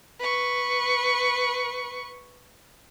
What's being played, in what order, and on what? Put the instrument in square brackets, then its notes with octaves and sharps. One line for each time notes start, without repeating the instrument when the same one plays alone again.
[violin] B4 C#6